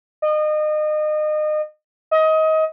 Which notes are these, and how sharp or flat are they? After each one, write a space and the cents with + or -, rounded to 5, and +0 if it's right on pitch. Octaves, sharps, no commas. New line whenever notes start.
D#5 -30
D#5 +25